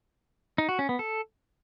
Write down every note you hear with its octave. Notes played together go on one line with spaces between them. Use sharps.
D#4
F#4
C#4
B3
A4